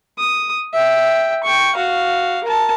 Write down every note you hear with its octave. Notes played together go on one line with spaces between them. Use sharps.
D#6
E5 G5
G5 C#6
F#4 F5
A#4 A5